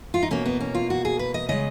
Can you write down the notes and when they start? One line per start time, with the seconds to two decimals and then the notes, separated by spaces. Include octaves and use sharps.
0.14 F4
0.23 D#4
0.31 B2 A#3 C#4
0.46 B3
0.60 C#4
0.75 F4
0.90 F#4
1.05 G#4
1.19 B4
1.34 D#5
1.49 C#3 G#3 D#5